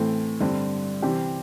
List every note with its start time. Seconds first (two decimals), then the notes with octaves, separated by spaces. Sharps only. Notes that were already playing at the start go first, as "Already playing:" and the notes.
Already playing: A2 E3 A3 C4 A4
0.40 G2 D3 G3 C4
1.02 C3 E3 G3 C4 G4